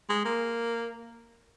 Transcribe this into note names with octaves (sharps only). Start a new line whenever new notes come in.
G#3
A#3